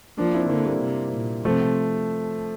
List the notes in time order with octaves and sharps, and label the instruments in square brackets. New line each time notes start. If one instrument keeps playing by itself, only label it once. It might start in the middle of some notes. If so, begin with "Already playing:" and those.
[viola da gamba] F3 [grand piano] A#3 D4
[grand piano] C4 E4
[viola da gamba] D3 [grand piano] A#3 D4
[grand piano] G3 A#3
[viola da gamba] C3
A#2
[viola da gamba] C3 [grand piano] F3 A3